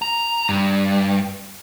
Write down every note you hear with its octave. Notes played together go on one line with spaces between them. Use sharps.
A#5
G2